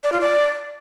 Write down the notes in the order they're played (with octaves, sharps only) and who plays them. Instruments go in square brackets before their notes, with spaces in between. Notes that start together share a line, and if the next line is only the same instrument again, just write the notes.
[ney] D5
F4
D5